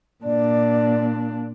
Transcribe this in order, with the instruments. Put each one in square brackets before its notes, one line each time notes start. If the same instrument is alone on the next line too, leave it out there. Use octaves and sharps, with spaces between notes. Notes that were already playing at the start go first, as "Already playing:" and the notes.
[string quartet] A#2 D4 [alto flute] D5